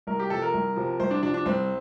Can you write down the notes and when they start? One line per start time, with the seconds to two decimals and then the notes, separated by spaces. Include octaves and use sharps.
0.07 C2 A#4
0.19 G4
0.30 C3 F3 A4
0.42 A#4
0.54 C2
0.76 C3 F3
1.00 C2 C5
1.11 D4
1.23 C3 F3 D4
1.34 D4
1.46 C2 C4